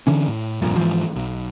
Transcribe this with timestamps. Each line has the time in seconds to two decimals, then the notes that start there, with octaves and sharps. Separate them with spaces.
0.07 D3 E3 C#4
0.28 A2
0.62 F1 A#1 G2 A#2
0.76 G#2 E3 F3
1.16 B1